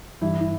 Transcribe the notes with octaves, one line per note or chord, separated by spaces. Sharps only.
G2 E3 E4
E4